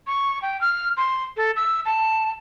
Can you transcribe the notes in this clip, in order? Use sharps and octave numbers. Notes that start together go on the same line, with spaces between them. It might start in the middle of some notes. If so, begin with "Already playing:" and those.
C#6
G5
F6
C6
A4
E6
A5